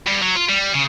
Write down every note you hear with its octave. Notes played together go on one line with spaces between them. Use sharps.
G2
F#3
F4
G3
C#3